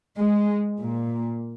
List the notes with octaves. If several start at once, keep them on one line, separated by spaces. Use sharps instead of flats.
G#3
A#2